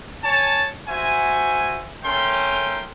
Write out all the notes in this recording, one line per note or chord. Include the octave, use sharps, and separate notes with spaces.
C#5 G#5 A5
F#4 C5 E5 G#5
A3 C#4 A#4 G5 C6